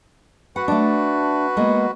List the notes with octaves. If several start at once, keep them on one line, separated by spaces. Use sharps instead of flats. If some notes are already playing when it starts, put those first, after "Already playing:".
F#4 B4 F#5
A3 D4
G#3 A#3 B3